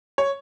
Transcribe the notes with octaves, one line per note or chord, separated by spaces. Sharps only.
C#5